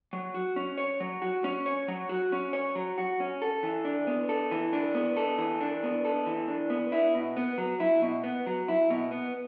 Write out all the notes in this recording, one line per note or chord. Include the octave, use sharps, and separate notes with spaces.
F#3
F#4
C#4
C#5
F#3
F#4
C#4
C#5
F#3
F#4
C#4
C#5
F#3
F#4
C#4
A4
E3
D4
B3
A4
E3
D4
B3
A4
E3
D4
B3
A4
E3
D4
B3
E4
B2
B3
F#3
E4
B2
B3
F#3
E4
B2
B3